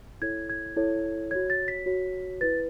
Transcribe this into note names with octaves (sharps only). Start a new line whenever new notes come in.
E4 A4 C#5 G#6
G#6
E4 A4 C#5
F#4 C#5 G#6
A6
B6
F#4 C#5
E4 B4 A6